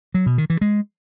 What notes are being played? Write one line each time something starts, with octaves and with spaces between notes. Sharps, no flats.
F#3
B2
D#3
E3
G#3